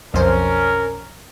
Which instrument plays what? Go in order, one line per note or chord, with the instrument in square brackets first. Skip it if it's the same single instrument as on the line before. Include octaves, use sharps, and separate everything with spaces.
[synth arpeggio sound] B1 F2 C5 [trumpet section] C#4 A#4